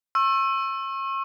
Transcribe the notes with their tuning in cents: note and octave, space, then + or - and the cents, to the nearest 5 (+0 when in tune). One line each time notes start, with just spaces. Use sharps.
C#6 -40 E6 +15